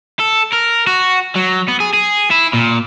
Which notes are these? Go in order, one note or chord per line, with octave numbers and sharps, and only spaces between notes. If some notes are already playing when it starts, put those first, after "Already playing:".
A4
A#4
F#4
F#3
B3
G#4
G#4
E4
A#2